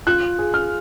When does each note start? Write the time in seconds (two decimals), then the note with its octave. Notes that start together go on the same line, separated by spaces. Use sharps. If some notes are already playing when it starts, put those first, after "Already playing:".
0.07 F4 F#6
0.39 G#4
0.54 F6